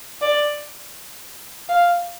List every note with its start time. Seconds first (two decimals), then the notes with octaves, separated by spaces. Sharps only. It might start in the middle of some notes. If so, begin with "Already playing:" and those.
0.21 D5
1.69 F5